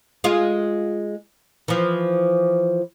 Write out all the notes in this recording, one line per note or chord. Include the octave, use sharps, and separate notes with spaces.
G#3 F4
E3 F3